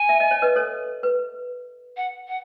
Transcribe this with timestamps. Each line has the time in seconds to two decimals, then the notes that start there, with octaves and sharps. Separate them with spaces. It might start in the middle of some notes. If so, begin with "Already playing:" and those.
Already playing: G#5
0.09 E5
0.20 D#5
0.31 C#5
0.42 B4 D#5
0.56 A4 C#5
1.03 B4
1.97 F#5
2.28 F#5